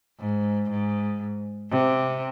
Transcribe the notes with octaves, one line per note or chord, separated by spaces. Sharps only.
G#2
G#2
C3